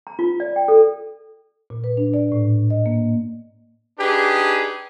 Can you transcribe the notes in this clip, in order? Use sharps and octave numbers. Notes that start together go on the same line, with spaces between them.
A#5
F4
D5
G5
A4
A#2
B4
D4
D5
A2
D#5
A#3
D4 D#4 G4 G#4 B4